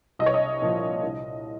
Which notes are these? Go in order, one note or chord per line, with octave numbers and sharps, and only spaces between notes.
C2 D#5
C#5
D#5
A#2 F3
C2